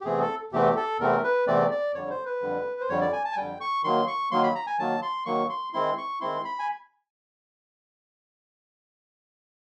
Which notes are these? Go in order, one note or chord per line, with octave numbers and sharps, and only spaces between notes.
G4
E2 C3 E3 A3 C4 G#4
A4
E2 C3 E3 A3 C4 G4
A4
E2 C3 E3 A3 C4 A#4
B4
E2 C3 E3 A3 C4 D5
D5
F2 D3 G3 C#5
C5
B4
F2 D3 G3
C5
F2 D3 G3 C#5
D5
G#5
A5
G#5
F2 D3 G3 G5
C#6
D#3 F#3 A#3 C6
C#6
D#3 F#3 A#3 C6
B5
A#5
G#5
D#3 F#3 A#3 A5
C6
D#3 F#3 A#3 C#6
C6
D#3 G#3 C4 E4 C6
C#6
D#3 G#3 C4 E4 C6
B5
G#5